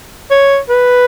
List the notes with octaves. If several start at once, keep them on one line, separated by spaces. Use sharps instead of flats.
C#5
B4